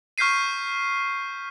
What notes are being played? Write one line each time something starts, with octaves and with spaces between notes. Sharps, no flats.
C#6 F6 G6 B6 C7 D#7